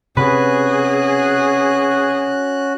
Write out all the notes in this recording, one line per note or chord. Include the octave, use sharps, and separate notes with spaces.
C3 C#4 F#4 G#4 B4 F#6